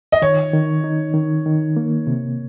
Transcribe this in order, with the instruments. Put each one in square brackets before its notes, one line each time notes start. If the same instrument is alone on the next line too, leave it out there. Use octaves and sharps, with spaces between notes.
[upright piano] D#5
[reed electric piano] D#3 [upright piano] C#5
[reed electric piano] D#3
D#4
D#3
D#3
A#3
C3